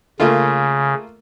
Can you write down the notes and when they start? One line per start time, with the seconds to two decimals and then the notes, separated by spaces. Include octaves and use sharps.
0.20 C#3 A3 A#3 F4